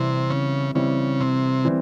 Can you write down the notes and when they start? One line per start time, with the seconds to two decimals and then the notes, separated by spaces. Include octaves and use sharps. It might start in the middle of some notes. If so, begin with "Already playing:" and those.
Already playing: C3 E3 G3 C4 E4
0.30 C#3
0.75 C#3 E3 G3 C4 E4
1.20 C3
1.65 E3 G3 C4